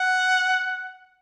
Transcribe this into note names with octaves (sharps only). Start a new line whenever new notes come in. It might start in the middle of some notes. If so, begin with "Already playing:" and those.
Already playing: F#5